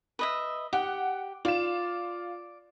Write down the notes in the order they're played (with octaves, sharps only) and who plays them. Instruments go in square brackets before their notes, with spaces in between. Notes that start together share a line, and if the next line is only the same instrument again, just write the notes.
[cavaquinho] B4 D#5 E5
[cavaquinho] G4 [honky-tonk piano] F#5
[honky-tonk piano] F4 E7 [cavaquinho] D5